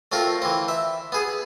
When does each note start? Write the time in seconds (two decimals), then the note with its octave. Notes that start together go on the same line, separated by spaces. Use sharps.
0.12 A3 C4 F4 A#4
0.42 E3 C4
0.68 E5
1.12 B3 G#4